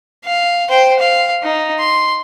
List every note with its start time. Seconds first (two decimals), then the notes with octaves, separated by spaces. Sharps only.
0.25 F5
0.69 C5 G5
0.99 F5
1.43 D#4
1.80 C6